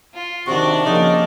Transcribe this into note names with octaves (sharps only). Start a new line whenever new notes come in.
F4
C3 D#3 D4 F#4 D5
C#3 F3 A#3 D#4